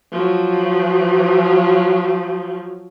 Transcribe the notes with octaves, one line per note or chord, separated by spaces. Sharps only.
F3 F#3